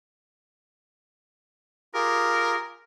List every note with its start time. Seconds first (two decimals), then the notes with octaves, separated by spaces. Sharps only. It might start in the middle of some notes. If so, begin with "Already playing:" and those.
1.94 F4 G4 G#4 A#4